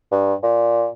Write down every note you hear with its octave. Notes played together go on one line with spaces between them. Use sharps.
G2
A#2